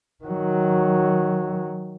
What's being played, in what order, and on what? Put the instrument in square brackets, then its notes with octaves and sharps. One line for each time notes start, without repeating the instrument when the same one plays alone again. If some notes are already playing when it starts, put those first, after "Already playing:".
[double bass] D#3 F#3